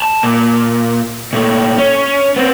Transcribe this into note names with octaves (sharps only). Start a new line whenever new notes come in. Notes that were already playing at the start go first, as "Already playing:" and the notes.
A5
A#2
A#2 A3
C#4
B3 C4